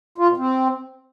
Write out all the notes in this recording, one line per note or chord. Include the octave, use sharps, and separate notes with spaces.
F4
B2
C4